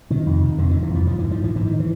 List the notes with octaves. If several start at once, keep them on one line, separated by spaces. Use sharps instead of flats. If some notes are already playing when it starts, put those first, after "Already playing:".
C3 D#3
F2
C3
F2 D3
C3 D#3
E3
F2 F3
G#2 F3
G#2 E3
F3
G#2 E3
G#2 E3
D#3
E3